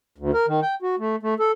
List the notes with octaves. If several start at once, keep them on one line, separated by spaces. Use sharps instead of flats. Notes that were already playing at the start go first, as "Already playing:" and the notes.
D2
A#4
D#3
G5
F#4
A3
A3
A4